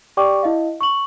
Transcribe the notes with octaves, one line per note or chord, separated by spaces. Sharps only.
G4 D5 G5 C#6 D6
E4 D#5 F5
C#6 F#7